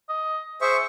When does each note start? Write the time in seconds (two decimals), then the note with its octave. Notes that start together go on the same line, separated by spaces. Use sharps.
0.09 D#5
0.61 G#4 C5 E5 C#6